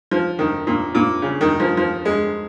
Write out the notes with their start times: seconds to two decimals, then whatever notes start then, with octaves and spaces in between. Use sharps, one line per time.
0.11 F3
0.39 D#3
0.67 A#2
0.95 A#2
1.22 C#3
1.41 D#3
1.60 F3
1.77 F3
2.05 G#3